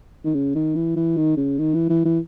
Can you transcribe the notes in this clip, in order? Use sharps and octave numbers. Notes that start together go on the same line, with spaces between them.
D#3
C#3
D#3
E3
E3
D#3
C#3
D#3
E3
E3
E3